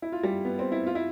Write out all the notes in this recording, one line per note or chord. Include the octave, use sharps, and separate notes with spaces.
E4
F4
G3
B3
C4
E4
F4
E4